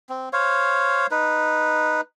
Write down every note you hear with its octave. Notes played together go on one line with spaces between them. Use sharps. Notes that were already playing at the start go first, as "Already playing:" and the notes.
C4
C5 C#5 F5
D#4 B4